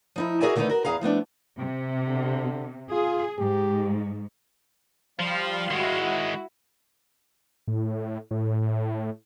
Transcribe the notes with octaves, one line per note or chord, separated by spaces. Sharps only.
F3 D#4 E4
F#4 G#4 A#4 D5 E5 G#5
D3 D#3 A3 C4 D#4 B4
F#4 A#4
E2 G#4 F5 A#5
F3 A3 B3 D4
C3
D3
F4 G#4
G#2 G4
F3 G3 F5 C6
D#3 G#3 E4 F#4
A2
A2